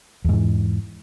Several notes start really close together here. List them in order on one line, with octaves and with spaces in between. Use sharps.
E2 G#2 E3